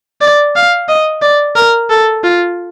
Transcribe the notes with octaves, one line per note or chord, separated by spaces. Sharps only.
D5
F5
D#5
D5
A#4
A4
F4